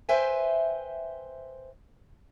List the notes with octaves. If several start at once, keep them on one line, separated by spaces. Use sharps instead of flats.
B4 C5 E5 G5 G#5